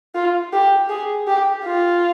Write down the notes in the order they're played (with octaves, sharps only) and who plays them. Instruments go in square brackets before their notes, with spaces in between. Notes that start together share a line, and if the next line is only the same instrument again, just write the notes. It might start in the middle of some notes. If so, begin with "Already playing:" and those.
[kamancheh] F4
G4
G#4
G4
F4